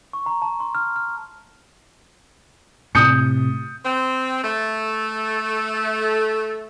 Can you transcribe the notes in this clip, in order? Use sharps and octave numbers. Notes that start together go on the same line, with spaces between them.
C#6
A#5
A5
C6
F6
F6
A2 C3 D#6 G6 C#7
C4
A3